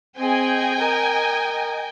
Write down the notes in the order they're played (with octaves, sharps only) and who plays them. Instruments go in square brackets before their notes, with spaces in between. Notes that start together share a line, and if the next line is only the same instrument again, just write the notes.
[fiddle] C4 G#4 [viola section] D#5 G5 G#5
[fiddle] A#4